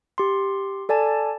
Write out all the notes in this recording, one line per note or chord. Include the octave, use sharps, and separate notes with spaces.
G4 C6
A4 D5 G#5 A5